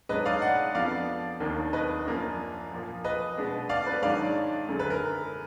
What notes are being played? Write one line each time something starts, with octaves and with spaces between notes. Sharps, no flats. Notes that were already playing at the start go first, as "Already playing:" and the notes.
G#2 F#3 D4 B4 D#5
D5 F5
D#5 F#5
F2 F3 B3 D4 D5 F5
D#2 D#3 A#3 D4
B4 D#5
F#2 F3 A#3 D4
A#2 F3 A#3
B4 D#5
B2 G#3 B3 D4
D5 F5
B4
G#2 D#3 F#3 D4 D5 F5
F#2 D3 G#3
B4
A#4